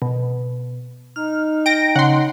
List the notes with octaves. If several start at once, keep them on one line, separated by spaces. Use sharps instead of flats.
B2
D#4 F6
G5 A#6 D7
C#3 F#5 C6